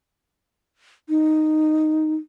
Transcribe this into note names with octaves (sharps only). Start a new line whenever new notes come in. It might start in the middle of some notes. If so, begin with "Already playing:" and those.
D#4